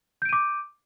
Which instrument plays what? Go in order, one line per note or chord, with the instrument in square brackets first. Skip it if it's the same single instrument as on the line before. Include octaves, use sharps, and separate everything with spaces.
[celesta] G6
D7
D#7
D6